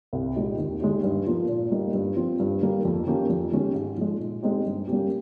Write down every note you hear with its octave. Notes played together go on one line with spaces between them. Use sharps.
C2
A#2 G#3 D#4 G4
D#2
D#3 G#3 D#4 G4
G2
F3 A#3 F4
A#2
G3 A#3 D#4
G2
F3 C4 F4
G2
D#3 G3 A#3
F2
D#3 A#3 C#4 G4
F2
D#3 G#3 C#4 G4
G#2
F3 G#3
A#2
G#3 C4 D#4 G4
G2
G3 A#3 C#4 G4